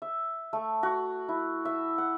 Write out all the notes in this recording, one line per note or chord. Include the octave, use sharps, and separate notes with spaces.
E5
A3
F#4
E4
E5
F#5